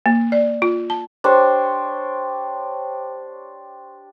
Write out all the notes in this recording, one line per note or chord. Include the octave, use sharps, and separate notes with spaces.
A#3
D5
F4
A5
D4 G4 C5 C#5